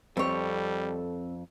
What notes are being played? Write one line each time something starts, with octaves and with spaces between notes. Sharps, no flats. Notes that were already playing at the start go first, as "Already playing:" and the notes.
F2 G3 C4 A4 C#5